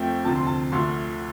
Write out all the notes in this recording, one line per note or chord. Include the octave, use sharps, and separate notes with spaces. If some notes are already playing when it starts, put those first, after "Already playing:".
Already playing: F2 F3 A3 G5
D2 C3 F3 A5
C6
A5
D2 D3 F3 A3 C6